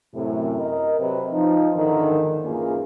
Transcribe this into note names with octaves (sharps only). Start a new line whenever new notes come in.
F#2 A2 C3
A#4 D#5
C3 F#3 B4 C5
F3 D#4
E2 G#2 D3 D#3
E2 G#2 A#3 C#4 F4 G#4